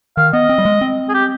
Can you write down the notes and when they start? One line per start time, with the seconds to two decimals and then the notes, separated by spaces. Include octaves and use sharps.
0.17 D#3 F5
0.33 B3 D#5
0.49 C4
0.58 G3
0.65 G#3
0.81 C4
1.09 G#4
1.14 G4